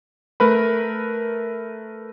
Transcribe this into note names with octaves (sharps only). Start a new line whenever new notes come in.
A3 A#4 B4 B5